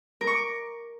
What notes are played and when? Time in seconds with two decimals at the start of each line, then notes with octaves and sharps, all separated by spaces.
0.21 A#4
0.27 C#6
0.33 D6